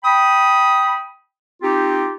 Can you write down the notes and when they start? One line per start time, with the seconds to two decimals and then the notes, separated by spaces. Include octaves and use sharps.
0.04 G5 B5 D#6
1.62 C4 D#4 F4 G4